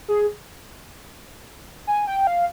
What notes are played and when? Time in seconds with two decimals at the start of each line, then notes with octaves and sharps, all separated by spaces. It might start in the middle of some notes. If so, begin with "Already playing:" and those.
0.08 G#4
1.87 G#5
2.07 G5
2.27 F5